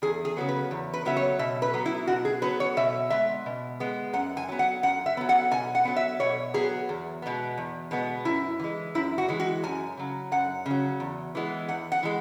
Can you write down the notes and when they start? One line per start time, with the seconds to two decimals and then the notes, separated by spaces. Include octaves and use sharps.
0.02 E2 G#4
0.25 G#4
0.37 C#3 F#3 B3
0.49 B4
0.71 E2
0.94 B4
1.05 C#3 F#3 B3 E5
1.17 C#5
1.39 B2 E5
1.62 B4
1.74 F#3 B3
1.86 E4
2.07 B2 F#4
2.25 G#4
2.42 F#3 B3 B4
2.60 C#5
2.77 B2 E5
3.10 G#3 B3 E5
3.46 B2
3.80 G#3 B3
4.13 F#2 F#5
4.37 G#5
4.49 F#3 B3
4.59 F#5
4.83 F#2 F#5
5.06 E5
5.17 F#3 B3
5.29 F#5
5.51 B2 G#5
5.75 F#5
5.85 F#3 B3
5.96 E5
6.20 B2 C#5
6.54 F#3 B3 G#4
6.89 E2
7.22 B2 G#3 B3
7.58 E2
7.91 B2 G#3 B3
8.25 F#2 E4
8.60 E3 G#3
8.95 F#2 E4
9.18 F#4
9.28 E3 G#3
9.40 F#4
9.64 F#2 G#5
9.97 C#3 F#3
10.32 F#2 F#5
10.66 C#3
10.71 F#3
11.00 E2
11.35 E3 G#3 B3
11.68 E2 F#5
11.92 F#5
12.03 E3 G#3